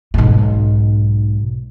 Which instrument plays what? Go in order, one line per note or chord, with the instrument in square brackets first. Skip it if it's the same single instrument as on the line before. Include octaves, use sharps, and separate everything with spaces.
[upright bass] B1 G#2